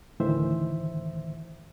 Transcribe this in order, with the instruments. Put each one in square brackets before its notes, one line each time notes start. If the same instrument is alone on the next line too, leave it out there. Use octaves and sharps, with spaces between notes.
[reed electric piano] D2 A2 D#3 E3 C5 E5